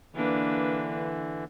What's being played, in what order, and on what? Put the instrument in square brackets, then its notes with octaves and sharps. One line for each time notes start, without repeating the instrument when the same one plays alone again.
[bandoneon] D3 E3 [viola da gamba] A#3 D4 B4